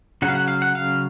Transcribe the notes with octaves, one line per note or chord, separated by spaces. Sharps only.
C#3 F#3 C#4 F#5
F5
F#5
F5
F#5
F5